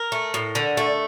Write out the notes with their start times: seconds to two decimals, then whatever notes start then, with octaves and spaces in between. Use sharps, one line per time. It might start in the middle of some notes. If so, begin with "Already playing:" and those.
Already playing: A#4
0.12 A3
0.34 A2
0.55 D3
0.77 A3